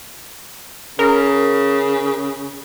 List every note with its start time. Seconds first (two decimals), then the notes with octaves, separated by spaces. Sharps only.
0.99 C#3 A#4